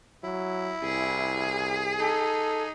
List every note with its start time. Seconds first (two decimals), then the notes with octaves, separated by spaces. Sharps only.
0.24 F#3 E4
0.84 C2 G#4
2.00 D#4 A4